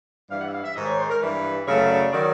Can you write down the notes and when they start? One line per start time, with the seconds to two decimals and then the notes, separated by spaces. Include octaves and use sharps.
0.29 G2 E3 G3 F5
0.41 F#5
0.48 E5
0.53 F5
0.64 E5
0.75 G#2 D#3 G#3 D#5
0.87 C#5
0.98 C5
1.09 A#4
1.21 G2 E3 G3 B4
1.67 F#2 C#3 F#3 A3 C#5
1.89 D5
2.12 D#3 F#3 D5